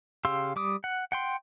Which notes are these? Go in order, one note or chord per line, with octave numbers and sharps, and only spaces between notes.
C#3 G4 F5 C6 E6
G3 D6 D#6
F#5
F#5 G5 C6